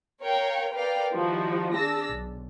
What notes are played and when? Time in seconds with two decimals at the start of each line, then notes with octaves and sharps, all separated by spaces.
0.23 A#4 C#5 F5 G5
0.73 A#4 B4 D5 F5 G5
1.14 D#3 F3 G3 D#4 E4 F#4
1.76 D4 G#4 A5 E6 A#6
2.10 B1